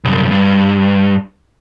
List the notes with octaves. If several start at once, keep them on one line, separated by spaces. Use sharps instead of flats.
C2 F#2
G2